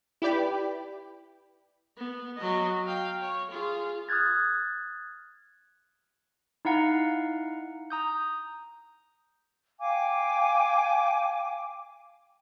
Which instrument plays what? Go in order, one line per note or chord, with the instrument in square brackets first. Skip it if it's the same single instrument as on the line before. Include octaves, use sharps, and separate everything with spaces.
[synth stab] E4 G4 B4 D5 G5 B5
[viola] B3
F#3 D#5
F5 G5
C#5
F4 G#4
[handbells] D#6 F6 F#6 G#6 A6
D#4 E4 F5 F#5 A#5
A#5 D#6 G6
[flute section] F5 G5 G#5 D6